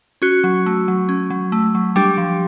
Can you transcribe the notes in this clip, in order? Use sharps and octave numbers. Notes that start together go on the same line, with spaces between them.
C#4 F#4
F#3
A3
F#3
C#4
F#3
A3
F#3
G3 D4 G4
F3